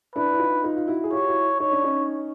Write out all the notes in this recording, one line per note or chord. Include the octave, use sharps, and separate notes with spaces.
D4 E4 B4
E4
D#4 F4
D#4 F4
F4
E4 F#4
G#4
F4 G4 C#5
E4 F#4
D#4 C#5
D4
C#4 D#4